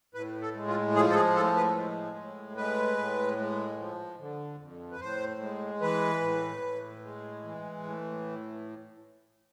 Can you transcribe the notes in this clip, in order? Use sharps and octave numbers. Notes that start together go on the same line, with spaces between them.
A2 B4
A4
G#3
F4
F3 G#4
A4
G#4
A2 A4
B4
G#3
A2
G#3 B4
A2
G#3
F3
D3
F2
B4
A2 C5
G#3
E3 B4
A2
A2
G#3
E3
A2